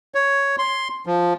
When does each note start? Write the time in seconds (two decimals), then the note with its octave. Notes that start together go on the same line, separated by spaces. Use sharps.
0.15 C#5
0.58 C6
1.06 F3